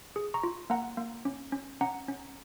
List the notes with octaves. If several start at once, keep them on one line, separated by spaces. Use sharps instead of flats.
G#4
A#5 C#6
F4
A#3 F#5 A#5
A#3
C#4
C#4
C#4 F#5 A#5
C#4